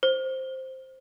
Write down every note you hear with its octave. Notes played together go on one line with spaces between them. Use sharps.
C5